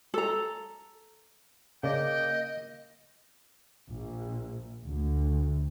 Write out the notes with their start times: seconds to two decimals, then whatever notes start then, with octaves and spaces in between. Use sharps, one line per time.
0.14 A4 A#5
1.83 C#3 A#3 D5 D#5 G5
3.89 A#1
4.85 D2